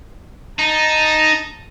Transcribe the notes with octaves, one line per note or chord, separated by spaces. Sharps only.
D#4 A5